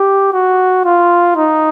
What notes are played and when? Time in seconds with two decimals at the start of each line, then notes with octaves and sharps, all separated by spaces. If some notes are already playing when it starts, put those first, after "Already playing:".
Already playing: G4
0.33 F#4
0.85 F4
1.37 D#4